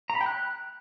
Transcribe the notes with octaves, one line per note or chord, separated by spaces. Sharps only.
A#5
B5
G5
F#6